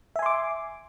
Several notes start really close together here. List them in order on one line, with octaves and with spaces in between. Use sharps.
E5 G#5 C6 D6